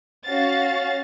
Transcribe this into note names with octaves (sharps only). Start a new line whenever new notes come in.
C#4 F#4 F5 A6